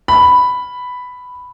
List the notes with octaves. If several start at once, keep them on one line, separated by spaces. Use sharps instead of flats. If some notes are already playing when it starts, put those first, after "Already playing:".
B5